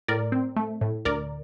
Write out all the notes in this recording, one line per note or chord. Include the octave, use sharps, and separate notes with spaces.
A2 A#4 D5
C4
A3
A2
D2 A#4 D5